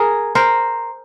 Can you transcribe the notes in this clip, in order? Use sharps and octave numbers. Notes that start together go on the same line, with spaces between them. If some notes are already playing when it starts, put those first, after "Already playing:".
Already playing: G#4 A#4
A#4 C5